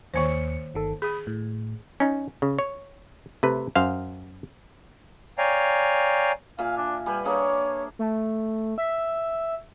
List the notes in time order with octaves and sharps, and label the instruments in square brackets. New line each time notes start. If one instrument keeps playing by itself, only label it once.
[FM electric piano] D#2 C#7 [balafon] D#3 A#3 C5
[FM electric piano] G1 D#3 A4
[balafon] G#4 [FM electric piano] B5 D#6
[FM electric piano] A2
[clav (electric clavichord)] C#4 D#4
C#3
C#5
C3 A3 B4
F#2 C5 F5
[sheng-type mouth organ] C#5 D5 F5 G5 G#5 A#5
[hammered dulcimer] A#2 E5 G#5 [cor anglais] F5
[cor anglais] D4
[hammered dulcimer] G3 B4 [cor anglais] G#5
[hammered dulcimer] A#3 D4 G#4 [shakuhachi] C#5 [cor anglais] D5
[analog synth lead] A3
E5